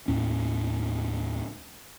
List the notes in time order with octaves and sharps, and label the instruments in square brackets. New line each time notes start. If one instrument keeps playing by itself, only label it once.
[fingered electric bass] D#2 A2 C#4